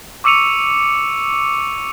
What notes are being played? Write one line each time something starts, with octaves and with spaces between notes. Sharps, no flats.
C#6 D6 E6 C#7 D#7 F7